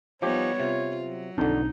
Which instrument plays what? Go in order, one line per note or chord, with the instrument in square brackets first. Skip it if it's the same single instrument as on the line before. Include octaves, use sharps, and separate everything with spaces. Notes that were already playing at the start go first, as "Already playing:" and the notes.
[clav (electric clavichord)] F3 G4 [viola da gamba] G3 B3 D#4 [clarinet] C#5
[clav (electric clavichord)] C3 [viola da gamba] F4
[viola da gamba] F#3
[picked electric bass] B1 C4 D4 [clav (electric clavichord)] F2 D3 [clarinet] D#4